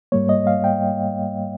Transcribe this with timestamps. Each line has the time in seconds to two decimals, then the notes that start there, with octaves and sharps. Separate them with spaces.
0.12 G#2 G3 A#3 C#5
0.29 D#5
0.47 F5
0.64 G5